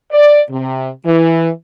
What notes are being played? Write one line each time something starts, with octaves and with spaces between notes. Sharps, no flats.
D5
C3
E3